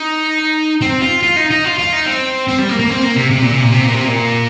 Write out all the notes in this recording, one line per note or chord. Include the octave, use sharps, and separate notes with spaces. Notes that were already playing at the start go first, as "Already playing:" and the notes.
Already playing: D#4
C4
F4
F4
D#4
D#4
F4
F4
D#4
C4
C4
G3
A#3
A#3
C4
A#3
C3
C3
A#2
C3
A#2
C3
A#2
C3
A#2